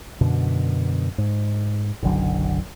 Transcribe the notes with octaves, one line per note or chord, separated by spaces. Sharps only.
F#2 B2 D3
G#2
F#1 B1 D3 F#3